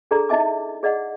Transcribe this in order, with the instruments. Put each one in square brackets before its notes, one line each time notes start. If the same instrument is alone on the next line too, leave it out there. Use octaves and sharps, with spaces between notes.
[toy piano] D4 G#4 A4 D5 A#5
D#4 E4 D#5 E5 G#5 D6
G#4 D5 D#5 F#5